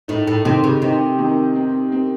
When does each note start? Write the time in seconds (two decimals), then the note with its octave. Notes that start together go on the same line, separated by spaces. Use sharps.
0.08 A2 D#4
0.27 A2
0.45 C3 D#3
0.64 C#3
0.82 C3 D#4
1.19 D#3
1.55 C4
1.92 C4